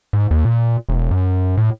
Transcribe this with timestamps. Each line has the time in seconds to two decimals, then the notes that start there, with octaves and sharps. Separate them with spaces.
0.13 G#2
0.31 D#2
0.45 A#2
0.89 E1
1.11 F#2
1.57 A2